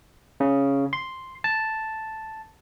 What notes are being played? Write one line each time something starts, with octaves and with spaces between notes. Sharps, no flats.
C#3
C6
A5